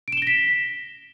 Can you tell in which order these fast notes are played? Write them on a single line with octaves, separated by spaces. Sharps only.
D7 E7 G7 A#6 B6